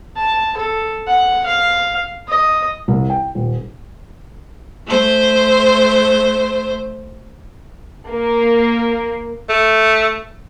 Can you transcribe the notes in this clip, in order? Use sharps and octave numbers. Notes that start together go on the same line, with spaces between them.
A5
A4
F#5
F5
D#5
C2
G5
D#1
A3 C5
A#3
A3